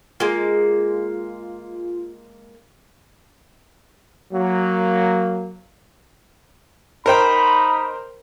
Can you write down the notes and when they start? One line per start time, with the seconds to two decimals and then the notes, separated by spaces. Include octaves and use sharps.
0.20 G#3 A#3 F4
4.33 F#3 A#3
7.06 D#4 A#4 C5 G5 B5